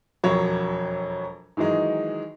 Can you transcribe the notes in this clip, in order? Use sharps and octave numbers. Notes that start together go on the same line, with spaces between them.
E1 F2 F#3 C#5
D#3 E3 F#3 G#3 D#4